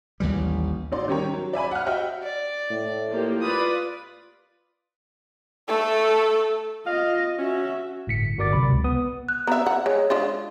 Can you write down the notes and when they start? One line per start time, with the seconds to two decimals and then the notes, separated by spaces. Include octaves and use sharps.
0.20 A1 D#2 E3 G3
0.92 A1 D#4 F#4 D5 C6
1.08 D#3 G3 C#4 G4 A#4 C#5
1.33 F#3
1.53 D5 E5 G#5 B5
1.71 F#5 F6
1.86 F#4 G4 D#5 E5 F#5 G5
2.23 D5
2.70 A2
3.10 F3 A#3 G4
3.42 F4 B4 D5 D#6
5.68 A3 A4
6.86 F4 D#5 F5
7.38 C#4 F#4 E5
8.07 G1 A2 B6 C#7
8.38 G1 F#4 A#4 D5 D6 A6
8.53 B1 C3 B5
8.69 C#2
8.84 B3 B4 D#6
9.29 F#6
9.47 B3 C4 E5 A#5
9.66 F#5
9.86 G#3 C#5
10.10 G#3 D4 F4